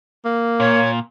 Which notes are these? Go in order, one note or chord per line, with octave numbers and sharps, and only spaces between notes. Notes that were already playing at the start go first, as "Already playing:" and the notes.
A#3
A#2 C#5